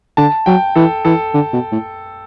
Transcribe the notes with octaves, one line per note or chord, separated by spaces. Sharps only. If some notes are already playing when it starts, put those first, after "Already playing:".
D3 A5
F#3 G5
E3 A4
E3 A4
D3
B2
A2